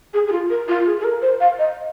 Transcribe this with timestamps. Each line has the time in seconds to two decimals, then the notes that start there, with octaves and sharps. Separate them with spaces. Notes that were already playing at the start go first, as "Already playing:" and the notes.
0.13 G#4
0.27 G#4
0.31 F4
0.50 A#4
0.68 F4
0.86 G#4
0.99 G#4
1.04 A#4
1.21 C5
1.40 F5
1.58 D#5